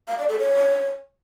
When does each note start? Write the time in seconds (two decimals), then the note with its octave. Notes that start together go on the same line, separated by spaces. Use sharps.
0.08 F5
0.18 D5
0.29 A4
0.39 C#5